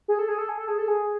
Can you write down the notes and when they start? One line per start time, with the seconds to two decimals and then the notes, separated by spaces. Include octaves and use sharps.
0.08 G#4
0.19 A4
0.29 G#4
0.38 A4
0.49 G#4
0.58 A4
0.68 G#4
0.78 A4
0.88 G#4